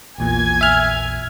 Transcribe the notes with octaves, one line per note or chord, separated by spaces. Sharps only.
A#1 E2 A#2 G#5 G#6
E5 F6